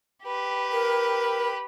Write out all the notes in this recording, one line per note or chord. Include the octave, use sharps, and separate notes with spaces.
G4 B4
A#4